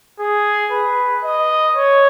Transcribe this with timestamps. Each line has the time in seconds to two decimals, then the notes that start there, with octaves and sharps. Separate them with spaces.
0.19 G#4
0.72 B4
1.24 D#5
1.76 C#5